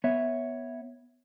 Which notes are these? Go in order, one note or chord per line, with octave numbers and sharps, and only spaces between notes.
B3 C#5 E5